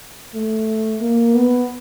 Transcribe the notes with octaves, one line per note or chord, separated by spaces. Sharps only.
A3
A#3
B3